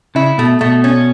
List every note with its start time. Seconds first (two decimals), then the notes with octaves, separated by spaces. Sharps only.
0.15 C#3 E4
0.38 B2 A3
0.61 B2 A3
0.84 C#4